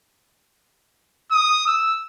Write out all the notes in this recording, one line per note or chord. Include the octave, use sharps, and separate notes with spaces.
D#6
E6